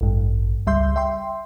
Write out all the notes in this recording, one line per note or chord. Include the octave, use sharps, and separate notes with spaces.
A1 G2
C#2 G3 E5 C6 G6
E5 G5 C6